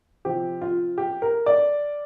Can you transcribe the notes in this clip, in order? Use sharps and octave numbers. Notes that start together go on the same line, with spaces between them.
C3 F3 C4 G4
F4
G4
A#4
D5